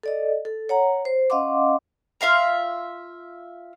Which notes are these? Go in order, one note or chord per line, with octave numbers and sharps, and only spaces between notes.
A4 D5 D#5
A4
C#5 F#5 A#5
C5
C#4 D#5 F5 F#5 C6 D6
F4 E5 F5 A#5